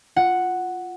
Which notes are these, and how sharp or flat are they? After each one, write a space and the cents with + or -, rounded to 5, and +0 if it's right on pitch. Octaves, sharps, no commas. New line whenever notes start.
F4 +0 F#5 +0